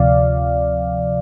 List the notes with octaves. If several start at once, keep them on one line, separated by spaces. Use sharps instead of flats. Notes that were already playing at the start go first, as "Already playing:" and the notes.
Already playing: D2 C3 F3 D5 F5